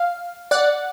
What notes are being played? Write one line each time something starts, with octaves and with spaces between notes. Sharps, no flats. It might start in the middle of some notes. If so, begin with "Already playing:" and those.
Already playing: F5
D5 F#5